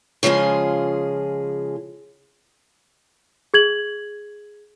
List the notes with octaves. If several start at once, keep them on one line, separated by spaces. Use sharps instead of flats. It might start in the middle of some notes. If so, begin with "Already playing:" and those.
C#3 F3 G#3 F4 G#4
G#4 G#6 F#7